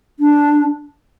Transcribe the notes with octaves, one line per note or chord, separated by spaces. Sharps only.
D4